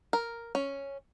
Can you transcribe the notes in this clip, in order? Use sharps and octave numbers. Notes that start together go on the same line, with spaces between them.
A#4
C#4